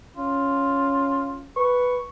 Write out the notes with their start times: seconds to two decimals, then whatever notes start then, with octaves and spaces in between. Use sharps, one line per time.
0.17 C#4 F4
1.57 B4 C#6